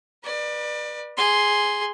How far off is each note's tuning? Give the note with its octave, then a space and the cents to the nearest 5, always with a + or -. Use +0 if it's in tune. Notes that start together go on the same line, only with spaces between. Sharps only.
B4 -30 D5 +25
G#4 +0 C6 +0